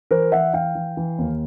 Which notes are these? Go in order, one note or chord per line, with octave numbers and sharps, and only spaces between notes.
E3 A#4 C5
E3 E5 F#5
E3 F5 G5
E3
E3
D#2